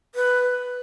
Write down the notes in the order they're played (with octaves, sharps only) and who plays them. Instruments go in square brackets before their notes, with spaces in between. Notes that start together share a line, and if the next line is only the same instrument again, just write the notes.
[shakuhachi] B4